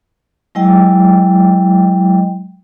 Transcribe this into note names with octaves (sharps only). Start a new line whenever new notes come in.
F#3 G#3 E4 D#5 G5